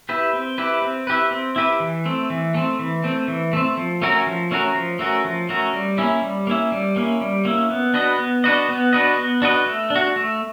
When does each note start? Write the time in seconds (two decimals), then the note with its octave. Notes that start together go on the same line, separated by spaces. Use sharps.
0.09 E4 G4 B4
0.33 C4
0.58 E4 G4 B4
0.82 C4
1.07 E4 G4 B4
1.31 C4
1.56 E4 G4 B4
1.80 E3
2.06 A3 C4
2.30 E3
2.54 A3 C4
2.79 E3
3.04 A3 C4
3.28 E3
3.53 A3 C4
3.77 F3
4.02 A3 C#4 F#4 A#4
4.27 F3
4.51 A3 C#4 F#4 A#4
4.75 F3
4.99 A3 C#4 F#4 A#4
5.25 F3
5.49 A3 C#4 F#4 A#4
5.73 G3
5.98 A#3 C#4 E4
6.22 G3
6.47 A#3 C#4 E4
6.72 G3
6.96 A#3 C#4 E4
7.21 G3
7.45 A#3 C#4 E4
7.70 B3
7.94 D4 F#4 B4 D#5
8.19 B3
8.44 D4 F#4 B4 D#5
8.69 B3
8.93 D4 F#4 B4 D#5
9.17 B3
9.42 D4 F#4 B4 D#5
9.66 A3
9.90 D4
9.96 F#4
10.16 A3